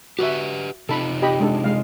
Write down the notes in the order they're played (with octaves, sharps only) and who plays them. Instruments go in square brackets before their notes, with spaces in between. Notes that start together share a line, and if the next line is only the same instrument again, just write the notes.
[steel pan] F#4 E5 [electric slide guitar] G4 B4 F#5
[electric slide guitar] C3 D#4 F4 [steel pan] A4 B5
[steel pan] G4 D#5 B5
G#3 D4 A4
G#3 F5